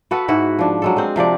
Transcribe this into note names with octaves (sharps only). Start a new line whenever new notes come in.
B3 F#4 A4 B4
G#2 E4 F#4
F3 D4
F#3 G#3 A4
G#3 C4
C3 F3 D4 D5